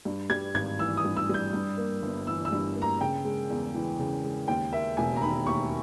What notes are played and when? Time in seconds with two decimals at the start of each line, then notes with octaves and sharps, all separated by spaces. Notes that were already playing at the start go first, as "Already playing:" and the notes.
0.05 G2
0.30 G3 G#6
0.54 G#1 G#6
0.79 E3 E6
0.97 D#6
1.05 G2
1.17 E6
1.29 G3 G6
1.53 G2
1.77 A#3
2.02 G1
2.27 E3 E6
2.45 E6
2.52 G2
2.76 A#3
2.82 A#5
3.01 C#3 G5
3.25 G#3
3.50 E2
3.75 E3
3.99 C#3
4.24 G#3
4.48 D#2 G5
4.73 A#3 E5
4.97 E1 G#5
5.16 A#5
5.22 D#3 B5
5.46 D#2 C#6